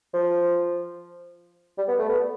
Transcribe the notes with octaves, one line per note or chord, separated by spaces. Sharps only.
F3
G3
B3
A3
B3